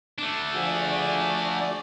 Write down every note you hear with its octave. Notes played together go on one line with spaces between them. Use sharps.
A3 D4
F3 F#4 G#4 D5